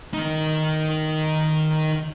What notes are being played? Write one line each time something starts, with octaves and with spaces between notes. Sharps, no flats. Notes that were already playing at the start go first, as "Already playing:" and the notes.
D#3 D#4